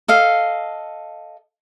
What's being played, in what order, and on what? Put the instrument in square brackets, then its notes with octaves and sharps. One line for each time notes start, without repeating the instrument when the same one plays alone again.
[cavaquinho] A4 D#5 F5